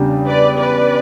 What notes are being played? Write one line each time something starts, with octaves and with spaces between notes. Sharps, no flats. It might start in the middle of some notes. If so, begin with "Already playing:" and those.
Already playing: E2 C#3 G3 D4 G4
B4 D5
B4 D5